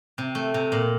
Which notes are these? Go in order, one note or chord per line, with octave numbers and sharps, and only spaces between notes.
C3
A3
C3
A#2